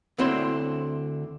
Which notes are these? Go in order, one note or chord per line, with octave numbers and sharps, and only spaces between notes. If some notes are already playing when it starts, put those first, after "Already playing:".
D2 D3 C4 E4 C#5 C6